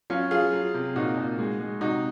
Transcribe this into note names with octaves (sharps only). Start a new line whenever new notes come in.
F#3 C#4 F4
F#3 F4 G#4
F#3
C3
A#2 D#4 F#4
A#2
G#3
G#3
C3 D#4 F#4